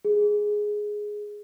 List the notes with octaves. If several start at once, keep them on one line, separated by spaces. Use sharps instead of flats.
G#4